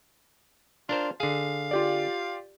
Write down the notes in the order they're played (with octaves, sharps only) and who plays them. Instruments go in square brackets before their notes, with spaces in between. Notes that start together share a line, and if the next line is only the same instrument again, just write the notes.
[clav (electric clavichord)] D4 A#4 C5 [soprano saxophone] F4
[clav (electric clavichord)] D3 G#4 [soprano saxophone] F5
[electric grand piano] F4 G4 D5